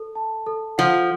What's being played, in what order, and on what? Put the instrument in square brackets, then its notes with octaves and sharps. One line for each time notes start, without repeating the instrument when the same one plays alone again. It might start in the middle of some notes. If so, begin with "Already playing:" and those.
Already playing: [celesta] A4
A5
A4
[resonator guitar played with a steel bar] F3 [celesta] F#5